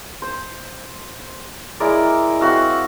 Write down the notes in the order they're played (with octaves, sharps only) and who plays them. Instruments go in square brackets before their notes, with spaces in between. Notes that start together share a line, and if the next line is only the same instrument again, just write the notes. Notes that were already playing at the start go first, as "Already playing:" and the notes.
[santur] C5
G#3 E4 A#4 D5
C4 F#4 E5 F5